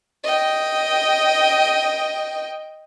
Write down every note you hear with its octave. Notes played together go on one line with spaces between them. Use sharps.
D#5 G5